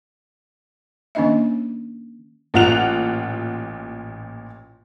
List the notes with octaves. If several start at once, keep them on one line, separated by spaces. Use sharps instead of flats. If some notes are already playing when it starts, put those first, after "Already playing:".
D#3 A#3 C#4 D4 D#5 E5
A1 A#2 F4 F#5 F#6 F7